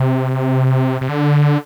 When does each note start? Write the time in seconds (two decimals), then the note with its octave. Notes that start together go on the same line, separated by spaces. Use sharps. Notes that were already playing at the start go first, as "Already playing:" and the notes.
Already playing: C3
1.01 C3
1.09 D3